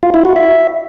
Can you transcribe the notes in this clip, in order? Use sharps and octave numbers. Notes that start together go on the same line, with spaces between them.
F4
E4
F#4
E5